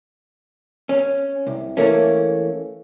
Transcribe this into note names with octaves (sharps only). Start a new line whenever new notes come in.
C#4
C2
E3 A3 A#3 C#4